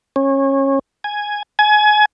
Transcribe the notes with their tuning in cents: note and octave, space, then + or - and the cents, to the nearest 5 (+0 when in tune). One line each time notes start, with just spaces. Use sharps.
C#4 -25
G#5 +0
G#5 +25